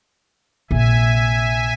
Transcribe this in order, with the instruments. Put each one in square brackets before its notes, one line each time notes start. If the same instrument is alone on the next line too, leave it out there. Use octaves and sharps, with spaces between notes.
[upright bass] A#1 C3 [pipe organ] E5 G#5